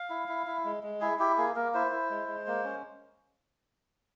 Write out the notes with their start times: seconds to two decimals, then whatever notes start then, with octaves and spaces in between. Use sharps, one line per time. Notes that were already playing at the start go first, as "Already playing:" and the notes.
Already playing: F5
0.10 E4
0.28 E4
0.47 E4
0.65 G#3
0.83 G#3
1.01 E4 G#4
1.19 E4 G4
1.37 A#3 G#4
1.56 A#3 A#4
1.74 E4 C5
1.91 E4
2.10 G#3
2.28 G#3
2.47 A#3
2.64 C#4